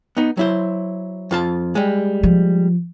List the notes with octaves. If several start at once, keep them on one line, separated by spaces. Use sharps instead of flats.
B3 D#4
F#3 E4 C5
F2 F4 A5
G3 G#3
F3